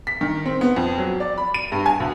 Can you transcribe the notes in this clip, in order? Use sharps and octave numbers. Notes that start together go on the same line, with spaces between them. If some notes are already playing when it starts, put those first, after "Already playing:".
B6
D#3
C4
B3
F2
F#3
D5
B5
D#7
G2
G#5
D2